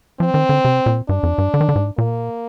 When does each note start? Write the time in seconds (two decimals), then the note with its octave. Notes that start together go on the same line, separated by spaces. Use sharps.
0.19 F3 C4
0.34 D#3
0.49 D3
0.65 C3
0.86 A#2
1.09 G2 D4
1.23 F2
1.38 G2
1.54 D3
1.61 D#3
1.69 D3
1.76 G#2
1.97 A#2 A#3